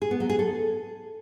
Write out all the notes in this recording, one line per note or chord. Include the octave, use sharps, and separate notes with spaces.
G#4
B3
F#3
G#4
A4